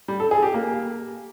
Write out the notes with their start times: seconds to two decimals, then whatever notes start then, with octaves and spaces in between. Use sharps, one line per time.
0.08 G3
0.20 A4
0.31 G#4
0.43 G4
0.54 A#3